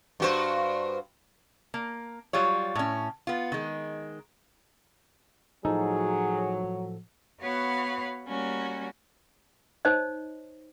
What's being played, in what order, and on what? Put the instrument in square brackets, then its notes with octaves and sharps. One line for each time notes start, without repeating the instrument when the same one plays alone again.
[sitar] G2 F#4 C5
[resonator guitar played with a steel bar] A#3
F#3 G3 F4 C#5
A2 C#4
B3 F4
D#3 G#3
[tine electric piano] A2 F3 A4 [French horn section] F#3 [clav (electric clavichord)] D#4 [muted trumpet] G#4
[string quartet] B3 F#4 B4 C#5 F5 F#5
G3 A#3 C#4 F#4
[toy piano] D#4 C5 C#5 D#5